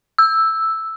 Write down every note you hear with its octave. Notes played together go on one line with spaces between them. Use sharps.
E6